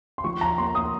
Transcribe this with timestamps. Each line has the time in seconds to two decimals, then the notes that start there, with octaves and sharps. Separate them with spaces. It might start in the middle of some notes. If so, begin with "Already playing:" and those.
0.18 C6
0.24 F3 C#6
0.41 A#5
0.58 A#3 C6
0.75 D#6